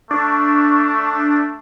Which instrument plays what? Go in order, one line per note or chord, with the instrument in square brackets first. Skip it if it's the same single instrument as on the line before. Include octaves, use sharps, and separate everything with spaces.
[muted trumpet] A3 [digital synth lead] D4 [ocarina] C#6